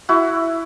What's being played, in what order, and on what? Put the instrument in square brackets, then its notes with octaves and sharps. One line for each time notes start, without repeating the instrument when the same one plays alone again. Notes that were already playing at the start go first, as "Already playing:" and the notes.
[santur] E4 F#4